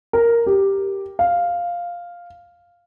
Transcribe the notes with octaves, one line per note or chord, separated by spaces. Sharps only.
A#4
G4
F5